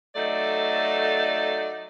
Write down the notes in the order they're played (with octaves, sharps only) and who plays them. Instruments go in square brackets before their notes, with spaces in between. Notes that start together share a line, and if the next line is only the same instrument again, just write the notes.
[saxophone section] F#3 A3 D#4 A4 D5